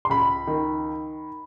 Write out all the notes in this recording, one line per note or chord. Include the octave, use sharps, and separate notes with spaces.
C6
C#2 B5
D#3